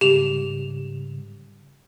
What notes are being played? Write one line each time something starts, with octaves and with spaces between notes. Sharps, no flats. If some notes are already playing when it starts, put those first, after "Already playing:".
G#2 C#3 G3 G4 E7 F7